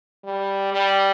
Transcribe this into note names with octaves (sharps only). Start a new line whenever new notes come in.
G3
G3